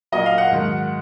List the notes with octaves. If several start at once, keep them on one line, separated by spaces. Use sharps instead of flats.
A#2 F#3 D#5
F5
F#5
G#2 D#3 F#3